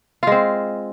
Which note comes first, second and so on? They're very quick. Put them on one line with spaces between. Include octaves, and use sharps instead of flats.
F4 G#3 C4